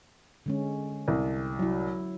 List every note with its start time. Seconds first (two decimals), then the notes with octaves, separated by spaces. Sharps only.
0.46 D3 G#3 C#4
1.08 C2
1.59 F#3 E4